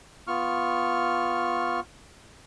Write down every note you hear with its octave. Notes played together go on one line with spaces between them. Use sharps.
B3 F4 C#6 F6